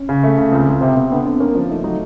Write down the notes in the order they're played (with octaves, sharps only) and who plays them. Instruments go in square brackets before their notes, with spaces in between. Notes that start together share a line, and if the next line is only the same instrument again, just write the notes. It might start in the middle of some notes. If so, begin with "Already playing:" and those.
Already playing: [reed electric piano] C#4
[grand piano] C#3
A3
C#3
[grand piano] C#2 [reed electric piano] C4
[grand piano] C#2
[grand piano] C3 [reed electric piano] C4
[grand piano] C3 [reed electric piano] B3
[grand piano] D3 [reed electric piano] B3
[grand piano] D3 [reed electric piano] C4
[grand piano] A#3 [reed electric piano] C#4
[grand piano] F3 [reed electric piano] D4
[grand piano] A3 [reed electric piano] D#4
[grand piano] F#3 [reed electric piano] D#4